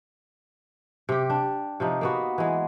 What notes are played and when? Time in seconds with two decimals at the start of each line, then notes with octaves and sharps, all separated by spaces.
1.09 C3 G4
1.30 D4
1.80 C3 F3 D#4
2.01 A#3 B3 F#4
2.38 E3 G#3